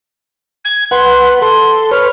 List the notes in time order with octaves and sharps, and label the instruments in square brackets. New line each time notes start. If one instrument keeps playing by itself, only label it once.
[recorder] G#6
[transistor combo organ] B4 F#5 [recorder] C6
[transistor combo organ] A4 [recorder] C6
[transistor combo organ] B4 C#5 [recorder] F6